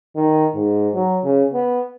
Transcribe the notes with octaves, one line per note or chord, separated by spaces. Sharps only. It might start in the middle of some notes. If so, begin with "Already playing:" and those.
D#3
G#2
F#3
C#3
B3